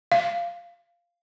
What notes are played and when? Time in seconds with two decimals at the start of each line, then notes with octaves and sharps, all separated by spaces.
0.12 F5